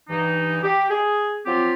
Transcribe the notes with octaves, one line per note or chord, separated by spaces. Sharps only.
G2 E3 D#4
G4
G#4
F3 F#3 C4 F4 G4